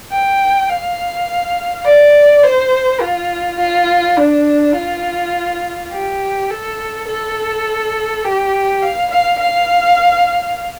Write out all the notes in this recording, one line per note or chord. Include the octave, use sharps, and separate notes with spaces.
G5
F5
D5
C5
F4
F4
D4
F4
G4
A4
A4
G4
F5
F5
F5